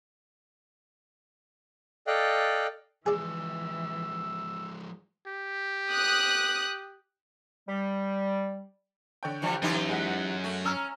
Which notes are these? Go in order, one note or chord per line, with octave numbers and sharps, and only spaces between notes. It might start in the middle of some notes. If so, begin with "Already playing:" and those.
A4 D5 D#5 F5 G5 F#6
E3 F3 G#3 G#4 D5 E6
G4
D#6 F#6
G3
D3 C#5 G5
E3 F3 G3
F#2 E3 D#4 G4
G#3 F#5 B6
A3
C#4 A#5 E6 F6